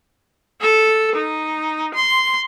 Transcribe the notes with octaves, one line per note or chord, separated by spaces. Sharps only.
A4
D#4
C6